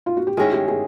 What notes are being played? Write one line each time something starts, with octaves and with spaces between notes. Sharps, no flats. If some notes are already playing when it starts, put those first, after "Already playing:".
F4
F#4
G4
D#3 G#3 C#4 E4 G#4
G4
G#4